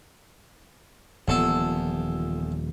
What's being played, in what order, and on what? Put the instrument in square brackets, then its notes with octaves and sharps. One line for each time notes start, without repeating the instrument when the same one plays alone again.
[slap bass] D#1 A#2 F3 [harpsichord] E2 A4